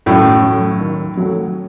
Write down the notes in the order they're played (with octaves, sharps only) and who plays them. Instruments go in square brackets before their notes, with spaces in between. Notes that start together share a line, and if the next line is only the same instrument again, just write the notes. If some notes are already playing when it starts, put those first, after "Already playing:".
[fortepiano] F#2 A2 [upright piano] D#3
[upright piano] F#3 A3
D#3
F#3 A3